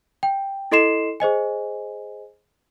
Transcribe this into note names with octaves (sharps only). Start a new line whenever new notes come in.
G5
E4 A4 D#5 C6 C7 E7
G#4 C5 D#5 G#5